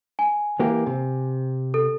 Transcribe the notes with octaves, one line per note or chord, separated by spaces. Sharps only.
G#5
E3 A#3 G4
C3
A4